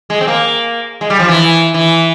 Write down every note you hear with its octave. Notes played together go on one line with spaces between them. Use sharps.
G#3
C4
A#3
G#3
G3
F3
E3
E3